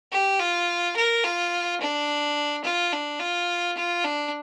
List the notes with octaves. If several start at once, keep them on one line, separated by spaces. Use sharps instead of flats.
G4
F4
A#4
F4
D4
F4
D4
F4
F4
D4